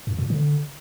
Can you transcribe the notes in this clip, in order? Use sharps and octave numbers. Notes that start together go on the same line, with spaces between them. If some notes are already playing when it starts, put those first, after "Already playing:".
F#2
A#2
D3